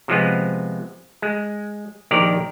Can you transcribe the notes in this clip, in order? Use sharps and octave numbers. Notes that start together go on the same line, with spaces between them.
C3 F3 G#3 B3
G#3
A#1 D#3 G4 A#4 D5